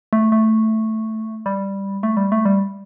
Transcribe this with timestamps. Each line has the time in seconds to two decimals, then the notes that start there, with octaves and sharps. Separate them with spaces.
0.13 A3
0.32 A3
1.46 G3
2.03 A3
2.17 G3
2.32 A3
2.45 G3